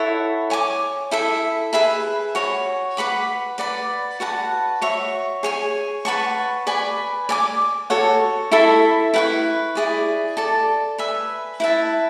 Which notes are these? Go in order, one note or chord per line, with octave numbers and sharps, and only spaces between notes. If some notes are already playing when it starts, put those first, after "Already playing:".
Already playing: E4 A4 C#5 F#5
C#5 G#5 D6
E4 A4 E5
G#4 B4 E5 B5
F#4 C#5 G#5
B4 F#5 B5 D6
B4 D5 F#5 B5
F#4 B4 F#5 A5
F#4 C#5 E5
G#4 C#5 G#5
B4 F#5 A5 C#6
B4 D5 G#5 B5
D5 G#5 D6
F#4 A4 C#5 F#5
E4 A4 E5 B5
E4 B4 F#5 C#6
E4 G#4 D5
A4 D5 A5
B4 E5 G#5
E4 B4 E5 A5